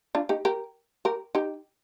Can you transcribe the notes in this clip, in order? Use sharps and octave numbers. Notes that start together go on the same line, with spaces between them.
D4 F4
D#4 G4
G4 A#4
G4 A#4
D#4 G4